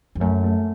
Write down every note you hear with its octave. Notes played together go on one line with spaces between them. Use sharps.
F2
F#2 A3
A3